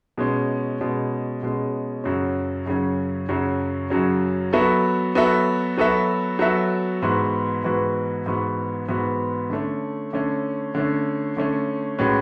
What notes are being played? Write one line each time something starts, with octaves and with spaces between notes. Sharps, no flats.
B2 G#3 C#4
B2 G#3 C#4
B2 G#3 C#4
F#2 C#3 F#3 C#4
F#2 C#3 F#3 C#4
F#2 C#3 F#3 C#4
F#2 C#3 F#3 C#4
F#3 B3 F#4 A4 E5
F#3 B3 F#4 A4 E5
F#3 B3 F#4 A4 E5
F#3 B3 F#4 A4 E5
G#2 E3 B3 F#4
G#2 E3 B3 F#4
G#2 E3 B3 F#4
G#2 E3 B3 F#4
D3 A3 C#4
D3 A3 C#4
D3 A3 C#4
D3 A3 C#4
A2 G#3 C#4 F#4 B4